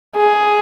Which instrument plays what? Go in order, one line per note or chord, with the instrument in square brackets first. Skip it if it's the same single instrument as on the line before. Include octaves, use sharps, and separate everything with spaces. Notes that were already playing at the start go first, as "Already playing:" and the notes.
[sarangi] G#4